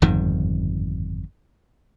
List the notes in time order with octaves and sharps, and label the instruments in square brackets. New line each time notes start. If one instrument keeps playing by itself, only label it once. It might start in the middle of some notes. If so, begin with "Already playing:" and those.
[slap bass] G1 F2 G#2 D#3